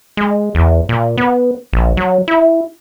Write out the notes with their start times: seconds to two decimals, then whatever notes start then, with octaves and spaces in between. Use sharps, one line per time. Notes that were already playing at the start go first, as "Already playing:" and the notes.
0.17 G#3
0.55 E2
0.89 A#2
1.18 B3
1.73 A#1
1.97 F#3
2.28 E4